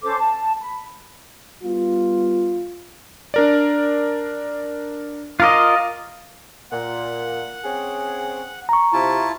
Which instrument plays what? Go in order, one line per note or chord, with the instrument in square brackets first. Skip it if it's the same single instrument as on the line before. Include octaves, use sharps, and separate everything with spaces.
[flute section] C#4 A4 C5 D6
A5
B5
[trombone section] G3 B3 F4
[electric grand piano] D4 A#4 D5
[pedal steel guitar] F4 A#4 D#5 [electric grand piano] F5 D6
[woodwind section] A#2 [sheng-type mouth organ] F#5
[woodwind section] C4 C#4 G#4
[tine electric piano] A#5 C#6
[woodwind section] C3 [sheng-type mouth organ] E4 F4 A5